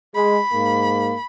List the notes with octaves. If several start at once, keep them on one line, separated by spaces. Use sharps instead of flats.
G#3 B5
G#2 A#3